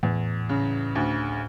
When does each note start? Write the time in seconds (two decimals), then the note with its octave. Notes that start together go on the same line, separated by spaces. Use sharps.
0.03 E2 A2
0.49 C#3
0.95 D2